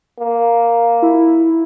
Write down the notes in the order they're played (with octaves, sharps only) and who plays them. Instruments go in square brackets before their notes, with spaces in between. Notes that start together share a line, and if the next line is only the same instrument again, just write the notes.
[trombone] A#3
[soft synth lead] E4